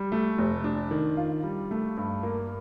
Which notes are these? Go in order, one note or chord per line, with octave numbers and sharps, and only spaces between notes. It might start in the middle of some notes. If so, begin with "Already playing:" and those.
Already playing: G3
A3
F1
D4
D#3
F4
G3
A3
G2
A#3